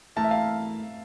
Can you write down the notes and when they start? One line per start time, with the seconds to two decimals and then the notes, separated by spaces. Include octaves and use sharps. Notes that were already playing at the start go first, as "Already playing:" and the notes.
0.16 E3 A3 E4 A#4 A5
0.24 E5
0.31 F5